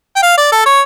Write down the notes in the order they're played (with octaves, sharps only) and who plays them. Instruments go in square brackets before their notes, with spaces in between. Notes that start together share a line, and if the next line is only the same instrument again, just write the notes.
[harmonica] G5
F5
D5
A4
C#5